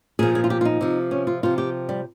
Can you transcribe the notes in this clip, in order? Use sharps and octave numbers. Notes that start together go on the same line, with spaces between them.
A#2 F3 G#4
G#4
F4
G4
F4
D#4
C3 F3
C#4
F4
C3 F3 F4
G4
G3